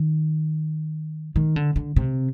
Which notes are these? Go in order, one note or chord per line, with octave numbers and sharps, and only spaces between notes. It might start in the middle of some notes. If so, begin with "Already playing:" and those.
Already playing: D#3
D#3
D3
D3
C3